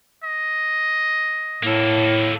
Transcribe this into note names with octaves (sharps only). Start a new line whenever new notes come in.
D#5
A2 A#3 A4